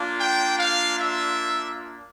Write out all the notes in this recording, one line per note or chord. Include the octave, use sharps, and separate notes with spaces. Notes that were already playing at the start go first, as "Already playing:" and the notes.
Already playing: A#3 D4 F4
G5
F5
E5